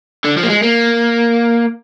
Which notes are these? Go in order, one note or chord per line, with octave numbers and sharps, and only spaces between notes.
D3
F3
A#3
G#3
A#3